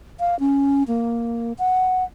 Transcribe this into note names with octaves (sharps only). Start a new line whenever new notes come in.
F5
C#4
A#3
F#5